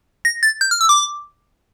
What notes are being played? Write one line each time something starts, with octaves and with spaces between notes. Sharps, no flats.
A#6
A6
G6
F6
E6
D6